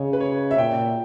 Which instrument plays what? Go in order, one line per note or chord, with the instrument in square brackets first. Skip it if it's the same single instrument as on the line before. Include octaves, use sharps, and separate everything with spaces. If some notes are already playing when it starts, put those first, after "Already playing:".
Already playing: [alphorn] C#3 [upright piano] C#5 D#5
[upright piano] B4
C#5
E5
[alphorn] A#2 [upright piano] G5